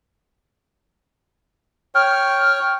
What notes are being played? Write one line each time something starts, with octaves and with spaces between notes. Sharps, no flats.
C#5 G5 F6